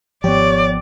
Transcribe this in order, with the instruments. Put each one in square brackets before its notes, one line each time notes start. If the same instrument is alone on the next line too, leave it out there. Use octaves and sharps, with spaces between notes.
[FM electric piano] G#1 G4 [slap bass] F3 B3 [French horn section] C#5 [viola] D5